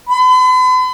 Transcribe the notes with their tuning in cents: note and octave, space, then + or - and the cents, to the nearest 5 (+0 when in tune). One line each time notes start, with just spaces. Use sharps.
B5 +45